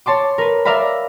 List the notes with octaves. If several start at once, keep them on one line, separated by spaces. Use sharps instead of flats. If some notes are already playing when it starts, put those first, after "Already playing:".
C#5 A5 C6 D6
A#4 B4
A#4 D5 E5 F5 A#5 B5